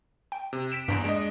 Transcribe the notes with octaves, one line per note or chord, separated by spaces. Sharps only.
G5
C3
B6 D7 E7
A#1 E2 G2 D7
G#3 D4 D#5